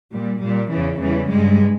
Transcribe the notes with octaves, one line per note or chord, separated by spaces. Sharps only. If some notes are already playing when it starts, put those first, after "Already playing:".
A#2 G3
A#2 G3
E2 C#3 E3
E2 C#3 E3 G3
G2 G3 G#3